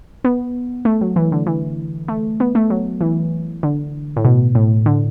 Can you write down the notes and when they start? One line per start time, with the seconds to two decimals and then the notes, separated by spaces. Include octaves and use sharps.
0.24 B3
0.85 A3
1.01 F#3
1.16 E3
1.32 D3
1.47 E3
2.08 A3
2.40 B3
2.55 A3
2.70 F#3
3.01 E3
3.63 D3
4.17 A2
4.25 B2
4.55 A2
4.86 D3